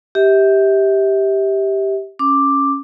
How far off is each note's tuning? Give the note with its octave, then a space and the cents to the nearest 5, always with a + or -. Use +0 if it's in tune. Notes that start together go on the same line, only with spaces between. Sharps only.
G4 +0 E5 -35
C#4 +0 D6 +5